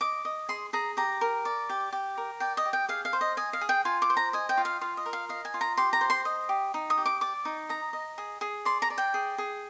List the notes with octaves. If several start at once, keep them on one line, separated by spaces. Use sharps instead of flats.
D#5 D6
D#5
G#4 C6
G#4 A#5
G4 A#5
A#4
D5
G4
G4
A#4
D5 G5
D#5
G4
G5
G#4 F5
F5
C5
D#5
D#5 G#5
F5
G#4
G5
F4 G#5
D6
C5
A#5
D#5 G#5
G5
F4
F5
F4 F5
D#5
A#4
F5
D#5 F5
G#5
F4
A#5
G4 C6
A#5
C5
C6
D#5
G4
D#4
D#6
G4
D6
D5 D6
D#4
D#5 A#5
D#5
G#4
G#4
D5 C6
A#5
D5
G5
G#4
G#4